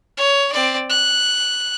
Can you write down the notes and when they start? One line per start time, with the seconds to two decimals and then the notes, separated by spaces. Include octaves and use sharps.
0.17 C#5
0.52 C4 D5
0.90 F#6